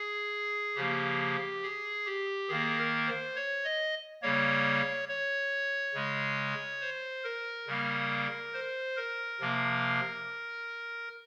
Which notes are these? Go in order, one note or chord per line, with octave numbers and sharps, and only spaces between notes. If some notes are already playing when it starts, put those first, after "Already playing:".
Already playing: G#4
C#3 F3 A#3 G4
G#4
G4
D#3 A#3 G#4
A#4
C5
C#5
D#5
C#3 G3 A#3 C#5
C#5
C#3 G#3
C5
A#4
C#3 G3 A#3
C5
A#4
C3 F3 A#3